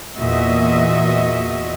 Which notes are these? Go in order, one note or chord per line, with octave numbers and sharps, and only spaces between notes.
E2 A#2 F#4 D#5 E5